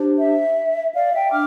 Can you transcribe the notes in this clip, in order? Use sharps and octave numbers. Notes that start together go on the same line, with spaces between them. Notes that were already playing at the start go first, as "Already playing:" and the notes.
Already playing: D4 G4 C5
E5
D5 F5
E5 G5
D4 D6 F6